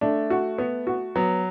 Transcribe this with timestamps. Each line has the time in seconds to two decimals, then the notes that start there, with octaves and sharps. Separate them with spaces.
0.01 A3 D4
0.30 F#4
0.58 B3
0.87 F#4
1.16 F#3 B3